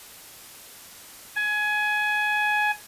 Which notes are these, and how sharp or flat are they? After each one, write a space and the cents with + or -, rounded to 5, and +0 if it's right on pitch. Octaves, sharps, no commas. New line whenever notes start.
G#5 +20